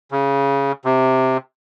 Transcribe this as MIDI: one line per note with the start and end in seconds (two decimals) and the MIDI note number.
0.11 0.72 49
0.85 1.37 48